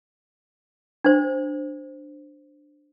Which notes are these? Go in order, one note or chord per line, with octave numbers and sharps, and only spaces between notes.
D4 C5